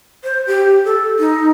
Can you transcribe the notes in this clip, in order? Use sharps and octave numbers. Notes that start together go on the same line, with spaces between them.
C5
G4
A4
D#4